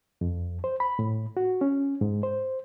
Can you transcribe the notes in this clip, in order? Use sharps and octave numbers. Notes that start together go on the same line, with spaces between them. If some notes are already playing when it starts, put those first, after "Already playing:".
F2
C5
B5
A2
F#4
C#4
G#2
C5